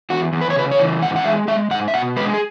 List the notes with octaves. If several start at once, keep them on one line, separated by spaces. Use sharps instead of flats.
E2 F#4
E2
B4
C#5
C#3 B4
C#5
E3
G#2 F#5
F#5
G#3 E5
G#3 E5
G#2 F#5
E5
B2 F#5
G#3 B4
G#4